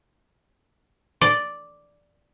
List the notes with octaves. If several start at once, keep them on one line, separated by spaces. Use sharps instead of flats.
D5